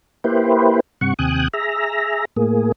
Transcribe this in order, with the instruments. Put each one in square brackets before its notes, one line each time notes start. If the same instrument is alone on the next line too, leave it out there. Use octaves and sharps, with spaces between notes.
[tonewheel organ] A#3 E4 G4 B4 C5
G2 C3 F#5 C#6
D#2 C3 G5 G#5 D#6 F#6
G#4 E5 A#5
A2 A#3 G#4